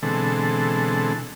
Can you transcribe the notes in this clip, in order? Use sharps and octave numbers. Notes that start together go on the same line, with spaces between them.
B2 D3 E3 G#3 C4 A4